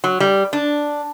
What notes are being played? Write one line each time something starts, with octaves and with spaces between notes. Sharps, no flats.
F#3
G3
D4